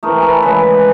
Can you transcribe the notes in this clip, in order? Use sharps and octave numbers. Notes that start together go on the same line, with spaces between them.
C3 E3 A3 G#4 A#4
A4 B4
C#3 E3 G#3 A4 B4